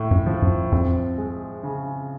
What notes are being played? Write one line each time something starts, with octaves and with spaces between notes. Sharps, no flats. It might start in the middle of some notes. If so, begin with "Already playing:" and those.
Already playing: A2
F#2
F3
F#2
F2 C4
G#3
C#3